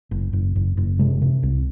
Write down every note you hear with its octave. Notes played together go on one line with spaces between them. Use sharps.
F#1
F#1
F#1
F#1
C3 G#3
C3
C2